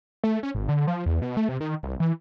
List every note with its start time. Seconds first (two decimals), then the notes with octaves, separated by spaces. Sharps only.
0.24 A3
0.43 C#4
0.55 G#1
0.69 D3
0.87 F3
1.06 E2
1.22 B2
1.37 A3
1.49 C3
1.60 D#3
1.83 C2
2.00 E3